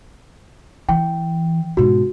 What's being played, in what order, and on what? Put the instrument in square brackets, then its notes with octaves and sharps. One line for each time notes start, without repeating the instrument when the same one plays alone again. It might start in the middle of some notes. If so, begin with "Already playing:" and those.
[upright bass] E3 [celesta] G5
[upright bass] G#2 B2 [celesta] F#4